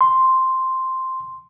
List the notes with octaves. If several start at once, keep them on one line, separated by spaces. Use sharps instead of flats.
C6